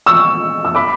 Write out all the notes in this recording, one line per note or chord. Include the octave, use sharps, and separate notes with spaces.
C#6 E6
E6
B5 D6